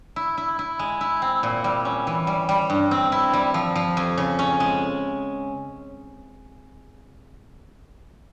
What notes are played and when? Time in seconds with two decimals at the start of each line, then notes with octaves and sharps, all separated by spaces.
0.16 E4
0.37 E4
0.59 E4
0.79 G#3
1.01 E4
1.22 C4
1.43 A#2
1.64 G3
1.85 C#4
2.07 E3
2.27 G3
2.49 G3
2.70 G2
2.91 C4
3.12 E4
3.33 G3
3.54 F3
3.75 F3
3.97 F2
4.17 C#3
4.39 C#4
4.60 G#3